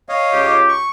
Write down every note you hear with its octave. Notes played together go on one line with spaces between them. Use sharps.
C#5 D#5 F5
C#2 G4
C#6